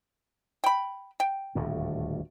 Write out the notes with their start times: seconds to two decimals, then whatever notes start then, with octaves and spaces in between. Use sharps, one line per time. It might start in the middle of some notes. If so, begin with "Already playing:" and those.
0.64 G5 B5
1.20 G5
1.55 D#1 D2 A2